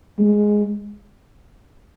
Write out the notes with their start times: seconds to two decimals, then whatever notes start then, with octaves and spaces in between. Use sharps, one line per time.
0.19 G#3